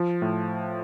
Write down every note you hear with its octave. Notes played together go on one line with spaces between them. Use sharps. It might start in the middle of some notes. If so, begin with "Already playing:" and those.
Already playing: F3
A2